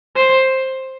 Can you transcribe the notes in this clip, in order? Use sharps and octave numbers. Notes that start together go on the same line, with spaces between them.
C5